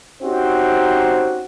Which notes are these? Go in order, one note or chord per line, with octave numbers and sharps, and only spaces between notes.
C4 C#4 D#4 F#4 G4 C5